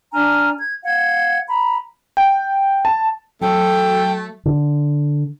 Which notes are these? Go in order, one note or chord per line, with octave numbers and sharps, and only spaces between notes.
D4 G#5 A#5 F6
G#6
F5 F#5 G#6
A#5 B5
G5
A5
F#3 A3 A4 G5
D3